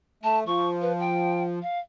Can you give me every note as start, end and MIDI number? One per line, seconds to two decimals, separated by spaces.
0.23 0.44 57
0.23 0.39 81
0.46 1.59 53
0.46 0.68 85
0.81 0.92 71
0.99 1.43 79
1.61 1.79 77